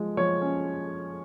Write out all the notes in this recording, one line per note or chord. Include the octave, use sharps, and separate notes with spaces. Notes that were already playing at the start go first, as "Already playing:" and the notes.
Already playing: F3 G#3
F3 C#5
C#4